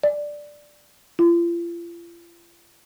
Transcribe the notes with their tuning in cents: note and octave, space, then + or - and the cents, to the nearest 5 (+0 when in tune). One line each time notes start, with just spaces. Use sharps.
D5 +5
F4 -40